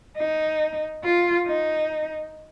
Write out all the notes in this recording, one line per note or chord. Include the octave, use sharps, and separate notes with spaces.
D#4
F4
D#4